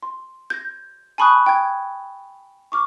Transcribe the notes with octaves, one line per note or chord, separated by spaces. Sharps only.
C6
G6 G#6 A#6
G#5 A5 B5 C#6 D#6 F#6
G5 G#6
C#6 D6 F6